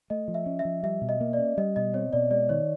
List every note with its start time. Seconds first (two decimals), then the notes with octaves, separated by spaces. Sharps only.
0.10 A3 D#5
0.28 F3
0.34 E5
0.46 C#4
0.59 E5
0.65 F3
0.83 G3 E5
1.02 B2
1.09 D#5
1.20 A#3
1.33 D5
1.38 C#4
1.57 G3 D#5
1.76 B2 D#5
1.94 C4 C#5
2.13 B2 D5
2.31 G#3 D5
2.49 D#3 C#5